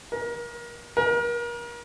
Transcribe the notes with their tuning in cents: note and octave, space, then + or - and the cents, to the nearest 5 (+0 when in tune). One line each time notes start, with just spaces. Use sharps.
A#4 +30
A#4 +35